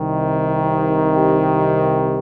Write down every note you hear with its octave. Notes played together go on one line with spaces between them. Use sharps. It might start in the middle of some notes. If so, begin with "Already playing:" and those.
Already playing: C2 C3 D#3
G4
G4